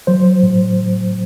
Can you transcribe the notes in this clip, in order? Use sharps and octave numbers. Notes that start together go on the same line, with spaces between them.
F#3 C5
A2